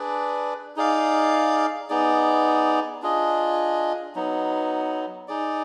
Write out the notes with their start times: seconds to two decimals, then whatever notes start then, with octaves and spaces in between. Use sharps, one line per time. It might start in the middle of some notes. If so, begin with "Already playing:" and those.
Already playing: D4 G#4 B4 D5
0.76 D#4 G#4 D5 F5
1.89 B3 D#4 G#4 D5
3.02 D4 F4 G#4 D#5
4.15 F#3 B3 D#4
5.28 D#4 G#4 D5